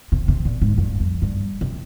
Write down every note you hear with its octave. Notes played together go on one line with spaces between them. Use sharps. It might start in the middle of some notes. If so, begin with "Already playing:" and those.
C3
C3
A#2
G#2
G2
F2
G2
C3